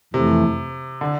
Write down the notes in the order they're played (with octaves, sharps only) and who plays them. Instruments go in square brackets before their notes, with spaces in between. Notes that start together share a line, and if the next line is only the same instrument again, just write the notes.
[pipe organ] F2 E3 A3 [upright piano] C3
[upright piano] D3